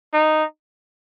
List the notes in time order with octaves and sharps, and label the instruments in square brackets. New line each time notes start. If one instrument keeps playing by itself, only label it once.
[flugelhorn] D#4